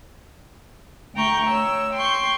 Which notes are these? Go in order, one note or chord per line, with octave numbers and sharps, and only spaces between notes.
D2 A3 G5 A#5 C#6 G6
C#5 E6
G5 C6 C#6 G6